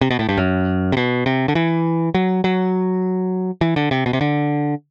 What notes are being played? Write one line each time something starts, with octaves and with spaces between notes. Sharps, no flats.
C3
B2
A2
G2
F#2
C3
B2
C3
D3
E3
F#3
F#3
E3
D3
C3
B2
C3
D3